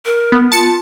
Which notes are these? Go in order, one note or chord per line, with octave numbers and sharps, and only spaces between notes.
A#4
B3
F4 A5 C#7